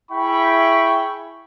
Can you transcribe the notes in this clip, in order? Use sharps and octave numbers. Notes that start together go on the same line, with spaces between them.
E4 G#4 E5 G5 B5 C#6